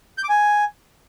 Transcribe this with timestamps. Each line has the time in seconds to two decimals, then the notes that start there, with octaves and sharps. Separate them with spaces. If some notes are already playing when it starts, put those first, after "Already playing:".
0.18 G6
0.24 D6
0.29 G#5